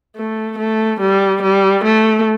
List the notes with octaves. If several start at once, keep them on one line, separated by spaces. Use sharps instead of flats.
A3
A3
G3
G3
A3